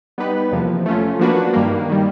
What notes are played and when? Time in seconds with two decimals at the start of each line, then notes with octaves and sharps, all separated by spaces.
0.18 G3 B3 D#4 G4 B4
0.52 E2 C3 F3 A#3
0.86 A3 C#4 F4
1.19 F3 A#3 D4 F#4 B4
1.53 G2 D#3 G3 A#3
1.89 D#3 G3